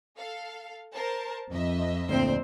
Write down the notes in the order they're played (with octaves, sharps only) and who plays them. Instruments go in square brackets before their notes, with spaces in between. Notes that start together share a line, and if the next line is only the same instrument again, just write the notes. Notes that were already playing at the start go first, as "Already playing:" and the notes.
[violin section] A4 F5
A#4 C5 A5
[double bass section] F2 [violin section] D#5 E5
[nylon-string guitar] D2 A#2 [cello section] C4 C5